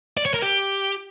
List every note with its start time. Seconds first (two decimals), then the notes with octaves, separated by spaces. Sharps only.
0.17 D5
0.26 C#5
0.34 A#4
0.42 G4